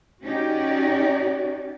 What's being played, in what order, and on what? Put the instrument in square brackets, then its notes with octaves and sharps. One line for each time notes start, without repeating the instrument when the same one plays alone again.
[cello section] C#4 D#4 F#4 G4 D5